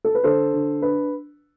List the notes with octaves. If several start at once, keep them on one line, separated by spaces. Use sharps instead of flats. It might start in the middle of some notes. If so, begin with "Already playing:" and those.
A4
B4
D3 A4 C5
D3
D4 B4